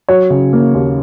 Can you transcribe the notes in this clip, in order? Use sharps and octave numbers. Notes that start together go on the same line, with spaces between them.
F#3 C#5
C#3
A#3
D#2